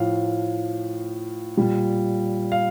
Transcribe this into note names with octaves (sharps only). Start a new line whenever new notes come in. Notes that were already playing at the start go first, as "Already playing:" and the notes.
Already playing: A2 F3 F5
A#2 G3
F5